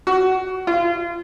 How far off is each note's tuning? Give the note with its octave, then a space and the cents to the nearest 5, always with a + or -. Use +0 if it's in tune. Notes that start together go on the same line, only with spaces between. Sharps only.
F#4 +15
F4 -30